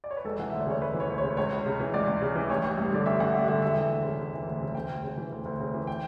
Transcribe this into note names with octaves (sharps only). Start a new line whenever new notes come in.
D5
C#5
B4
E1 A4
E3 F#5
D2 E5
D5
C#3 C#5
E1 B4
E3
C#5
D2
C#3 C#5
C#2 C#5
C#2
C#3
E3
C#2 D5
C#2
C#3
E3
A1 C#5
A1
G2
D3 D5
A1 E5
A1 F#5
G2 E5
D3 E5
E1 E5
E3
D2
C#3
E1
E3
D2
C#3
D2 G5
D2
C#3
E3
D2
D2
C#3
E3
G5